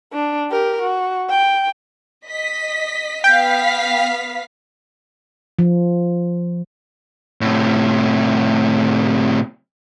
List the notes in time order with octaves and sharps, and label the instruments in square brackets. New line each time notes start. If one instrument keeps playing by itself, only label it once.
[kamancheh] D4
G4 A#4
F#4
G5
[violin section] D#5 B6
[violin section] B3 F5 B6 [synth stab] G5
[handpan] F3
[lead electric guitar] A2 C3